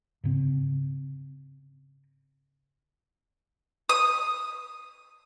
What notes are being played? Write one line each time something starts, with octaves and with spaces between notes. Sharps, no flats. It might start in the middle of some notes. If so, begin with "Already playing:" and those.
G#2 C#3 C4
D#6